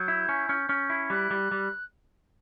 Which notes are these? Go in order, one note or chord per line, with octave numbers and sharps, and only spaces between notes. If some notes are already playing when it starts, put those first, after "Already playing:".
Already playing: F#3 G6
E4
C#4
C#4
C#4
E4
G3 F#6
G3
G3